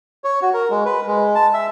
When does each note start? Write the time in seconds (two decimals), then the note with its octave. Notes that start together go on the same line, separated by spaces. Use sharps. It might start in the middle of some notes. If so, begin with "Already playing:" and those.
0.24 C#5
0.42 F#4
0.54 A#4
0.70 G#3
0.85 B4
1.07 G#3
1.35 A5
1.54 E5